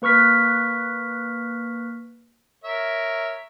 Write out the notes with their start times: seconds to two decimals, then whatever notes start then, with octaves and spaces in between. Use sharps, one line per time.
0.02 A#3 B4 C#6 F6 B6
2.64 A#4 C#5 E5